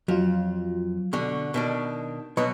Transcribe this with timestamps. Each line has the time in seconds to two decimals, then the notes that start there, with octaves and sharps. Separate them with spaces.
0.08 F2 F#3 F4
1.13 B2 D3 C#6
1.54 B2 D#3 D4
2.37 B2 F#3 B4 D#5 C#6